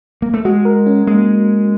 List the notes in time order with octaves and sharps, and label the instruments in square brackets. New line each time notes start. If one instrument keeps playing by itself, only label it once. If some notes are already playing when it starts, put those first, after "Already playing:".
[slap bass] A#3
A3
[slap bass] G#3 [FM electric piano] F#4
[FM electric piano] A#4
C#4
[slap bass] G#3 [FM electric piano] A#3